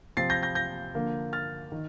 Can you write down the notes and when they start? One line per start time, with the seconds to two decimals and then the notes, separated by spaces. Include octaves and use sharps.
0.17 C3 F3 C4 A6 C7
0.30 G6 A#6
0.43 G6 A#6
0.55 G6 A#6
0.95 D3 F3 A#3
1.33 F6 A6
1.72 D#3